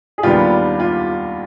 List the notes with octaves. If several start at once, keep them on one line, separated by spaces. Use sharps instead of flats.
G#4
D#2 D#3 G3 B3 D4 F4 G4
F4